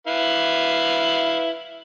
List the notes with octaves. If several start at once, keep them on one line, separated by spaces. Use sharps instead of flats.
E4 B4 F5